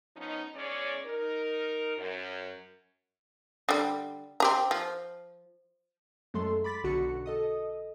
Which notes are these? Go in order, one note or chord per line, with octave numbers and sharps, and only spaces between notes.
F3 B3 C#4 D#4
E2 G#3 C#4 C#5 D5
D#4 A#4
F#2
D3 G3
C4 G4 A#5
F3
F#2 F#3 G#3 A3 A4 C6
B5 D6 A6 B6
B1 D3 F#4 C#7
A4 D#5 D#6